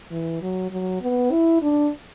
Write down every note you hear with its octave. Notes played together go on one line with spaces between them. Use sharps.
E3
F#3
F#3
B3
E4
D4